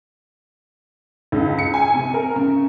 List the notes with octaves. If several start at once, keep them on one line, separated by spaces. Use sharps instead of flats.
C#2
C#7
G#5
C3
A#4
C#3